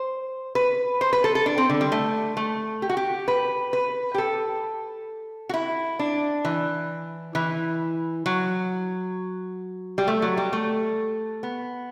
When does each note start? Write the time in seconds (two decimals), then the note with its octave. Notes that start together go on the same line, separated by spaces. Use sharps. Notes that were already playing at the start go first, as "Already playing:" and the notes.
Already playing: C5
0.55 B4
1.01 C5
1.13 B4
1.24 A4
1.35 A4
1.46 D4
1.58 C4
1.70 D3
1.81 G3
1.92 A3
2.37 A3
2.82 G4
2.89 F#4
2.97 G4
3.28 B4
3.73 B4
4.14 G4
4.18 A4
5.49 F#4
5.54 E4
5.99 D4
6.45 E3
7.35 E3
8.26 F#3
9.98 G3
10.08 A3
10.22 F#3
10.37 G3
10.53 A3
11.43 B3